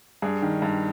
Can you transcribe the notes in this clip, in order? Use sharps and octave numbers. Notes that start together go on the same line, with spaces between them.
G2 G#4
D#3
G2